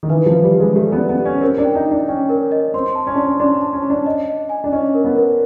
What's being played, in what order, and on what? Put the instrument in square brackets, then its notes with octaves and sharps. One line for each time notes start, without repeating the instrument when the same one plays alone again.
[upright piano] D#3
[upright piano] E3 [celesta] B4
[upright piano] F3
[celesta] B4
[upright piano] G3
[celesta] G4
[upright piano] G#3
[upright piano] A3 [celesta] G4
[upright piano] B3
[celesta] D5
[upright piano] B3
[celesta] G4
[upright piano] C#4
[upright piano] C4 [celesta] A#4
[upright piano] D4
[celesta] G5
[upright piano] D#4
[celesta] D#5
[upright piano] D4
[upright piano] C#4 [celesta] G5
[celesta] A#4
D#5
[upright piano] C4 [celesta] C6
[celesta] A5
[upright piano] C#4
[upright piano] D4 [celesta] C6
[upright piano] C#4
[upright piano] D4 [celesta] C6
[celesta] A5
[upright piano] C#4
[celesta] A5
[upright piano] D4
[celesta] D#5
D#5
G#5
[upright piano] D4
[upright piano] C#4 [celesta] D#5
[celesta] A#4
[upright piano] B3
[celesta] A#4